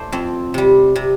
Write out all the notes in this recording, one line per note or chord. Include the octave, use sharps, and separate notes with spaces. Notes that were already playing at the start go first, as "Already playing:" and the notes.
Already playing: A2 A3 C5 D5
F2 C4
C3 G3
C3